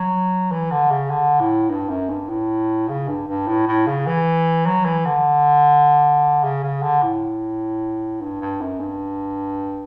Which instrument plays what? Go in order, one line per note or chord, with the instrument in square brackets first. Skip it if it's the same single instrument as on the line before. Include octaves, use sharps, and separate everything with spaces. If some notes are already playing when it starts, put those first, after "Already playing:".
Already playing: [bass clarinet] F#3
E3
D3
C#3
D3
A2
G2
F#2
G2
A2
C#3
G2
G2
A2
A2
C#3
E3
F#3
E3
D3
C#3
C#3
D3
A2
G2
G2
F#2
G2